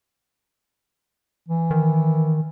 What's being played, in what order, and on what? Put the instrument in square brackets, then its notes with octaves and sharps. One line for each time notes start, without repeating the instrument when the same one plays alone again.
[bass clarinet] E3
[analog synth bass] D#3